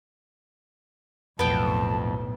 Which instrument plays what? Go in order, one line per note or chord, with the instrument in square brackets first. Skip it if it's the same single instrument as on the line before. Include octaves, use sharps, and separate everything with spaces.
[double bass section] B1 A2 [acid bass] F2 [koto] B3 G5 [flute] A5